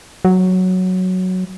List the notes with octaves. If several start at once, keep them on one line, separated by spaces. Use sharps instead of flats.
F#3